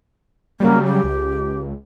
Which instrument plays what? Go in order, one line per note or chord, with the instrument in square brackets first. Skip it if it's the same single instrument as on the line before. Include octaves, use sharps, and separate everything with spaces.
[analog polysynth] C#3 F#3 G3 [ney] A#3
[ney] G4
[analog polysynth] C#2